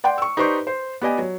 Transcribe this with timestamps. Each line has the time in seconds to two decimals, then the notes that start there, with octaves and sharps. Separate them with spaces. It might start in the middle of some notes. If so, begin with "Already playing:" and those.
0.04 D5 F#5 G5 C6
0.18 C#6 E6
0.37 D#4 G4 B4 C5 D5 C#6
0.67 C5
1.02 B3 G4 D5 D#5 G#5
1.18 F#3